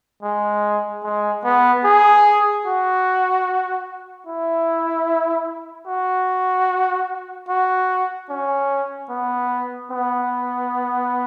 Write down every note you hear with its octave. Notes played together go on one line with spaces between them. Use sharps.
G#3
G#3
B3
G#4
F#4
E4
F#4
F#4
C#4
B3
B3